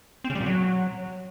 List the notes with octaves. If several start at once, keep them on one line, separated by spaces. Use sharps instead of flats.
C4
C#3
G3
A#2
F#3